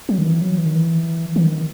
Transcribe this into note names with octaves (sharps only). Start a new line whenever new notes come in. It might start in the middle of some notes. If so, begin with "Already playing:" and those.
F#3
D#3
E3
F#3
E3
D#3
E3
E3
D#3